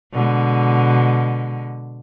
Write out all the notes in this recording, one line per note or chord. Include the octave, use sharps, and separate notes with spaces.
B2 D3 G#3